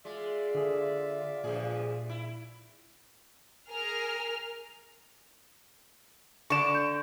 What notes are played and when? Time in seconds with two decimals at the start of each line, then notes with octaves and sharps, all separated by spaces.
0.05 G#3 F4 D5 E5
0.55 D3 G#4
1.44 G2 A#2 F3 G#4
2.09 E4
3.70 G#4 A#4 F6
6.50 D3 D5 C#6 E7
6.75 G6